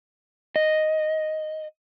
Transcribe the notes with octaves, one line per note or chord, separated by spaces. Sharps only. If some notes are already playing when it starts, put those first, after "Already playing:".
D#5